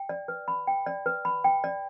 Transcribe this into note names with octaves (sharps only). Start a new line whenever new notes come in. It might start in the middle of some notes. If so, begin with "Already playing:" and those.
Already playing: G5
D5
B4
B5
G5
D5
B4
B5
G5
D5